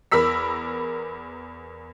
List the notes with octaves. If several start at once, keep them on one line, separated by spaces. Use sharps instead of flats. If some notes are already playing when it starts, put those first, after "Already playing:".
E2 A#4 B5 E6 B6